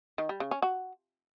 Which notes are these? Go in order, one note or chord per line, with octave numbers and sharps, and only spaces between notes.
D#3
G3
C#3
C#4
F#4